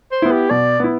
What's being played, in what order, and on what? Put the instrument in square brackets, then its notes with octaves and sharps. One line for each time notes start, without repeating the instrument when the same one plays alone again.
[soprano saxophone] C5
[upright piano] B3 E4
[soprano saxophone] G4
[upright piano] B2 [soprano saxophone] D5
[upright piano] B3 E4